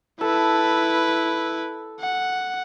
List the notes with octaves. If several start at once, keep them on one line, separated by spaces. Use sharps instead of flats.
E4 A4 B4
F#5